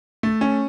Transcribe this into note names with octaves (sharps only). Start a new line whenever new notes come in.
A3
C#4